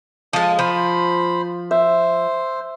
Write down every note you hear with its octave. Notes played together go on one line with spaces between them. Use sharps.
F3 G#3 A5 D#6
F3 C5 B5
C5 E5